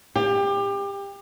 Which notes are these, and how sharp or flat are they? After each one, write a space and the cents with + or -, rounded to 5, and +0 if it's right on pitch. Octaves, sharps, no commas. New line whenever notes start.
G4 +25